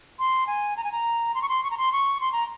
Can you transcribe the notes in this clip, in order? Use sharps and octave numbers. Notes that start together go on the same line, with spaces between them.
C6
G#5
A#5
G#5
A#5
C6
C#6
C6
C#6
A#5
C6
C#6
C6
A#5